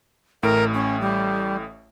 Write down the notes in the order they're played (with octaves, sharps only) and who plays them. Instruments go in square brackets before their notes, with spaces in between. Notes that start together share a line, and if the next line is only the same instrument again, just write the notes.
[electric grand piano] A1 A2 D7 [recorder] A#4
[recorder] C#4
G3